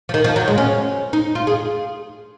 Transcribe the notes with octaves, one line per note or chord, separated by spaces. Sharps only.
F3
D#3
F3
F#3
G#3
C#4
D#4
F4
G#4